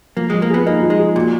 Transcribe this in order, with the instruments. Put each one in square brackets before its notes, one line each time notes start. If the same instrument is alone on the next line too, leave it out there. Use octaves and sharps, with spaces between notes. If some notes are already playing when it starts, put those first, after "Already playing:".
[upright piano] F3 [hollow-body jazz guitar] A#3
[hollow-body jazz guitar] G#3
[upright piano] F3
[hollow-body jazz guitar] A#3
[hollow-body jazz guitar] B3 [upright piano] G#4
[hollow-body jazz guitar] A#3 [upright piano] D#4
[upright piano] F3
[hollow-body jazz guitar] G#3
[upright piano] G#4
[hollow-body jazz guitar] A#2 [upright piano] F#4